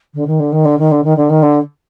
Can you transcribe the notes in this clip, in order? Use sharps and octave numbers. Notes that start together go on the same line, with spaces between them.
D3
D#3
D3
D#3
D3
D#3
D3
D#3
D3
D#3
D3